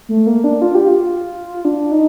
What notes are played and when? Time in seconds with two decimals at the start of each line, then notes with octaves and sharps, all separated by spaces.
0.09 A3
0.27 A#3
0.44 D4
0.62 F4
0.75 G4
0.88 F4
1.65 D4
1.92 D#4